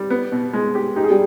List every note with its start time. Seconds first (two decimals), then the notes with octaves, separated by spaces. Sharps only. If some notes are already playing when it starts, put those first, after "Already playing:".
Already playing: G3
0.10 B3
0.32 B2
0.53 G#3
0.75 G4
0.96 D#4 G4
1.03 G#4
1.10 G3 G4